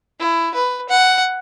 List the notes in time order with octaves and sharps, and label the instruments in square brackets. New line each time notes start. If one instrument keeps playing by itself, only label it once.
[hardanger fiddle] E4
B4
F#5